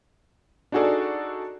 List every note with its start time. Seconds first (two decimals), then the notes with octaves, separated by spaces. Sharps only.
0.72 D4 D#4 F#4 G#4 A4 D5